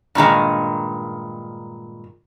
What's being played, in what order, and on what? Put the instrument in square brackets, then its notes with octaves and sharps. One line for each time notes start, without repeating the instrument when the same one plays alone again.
[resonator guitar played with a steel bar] G2 A#2 D#3 G#3